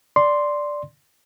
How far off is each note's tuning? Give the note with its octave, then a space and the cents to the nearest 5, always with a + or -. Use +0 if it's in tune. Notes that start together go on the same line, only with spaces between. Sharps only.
D5 +0 C6 +0